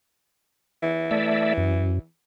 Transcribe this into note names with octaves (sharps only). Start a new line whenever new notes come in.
E3
A3 D5 E5
F#2